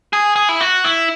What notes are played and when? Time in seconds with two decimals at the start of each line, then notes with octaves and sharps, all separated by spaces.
0.13 G#4
0.36 G#4
0.49 E4
0.61 F#4
0.84 E4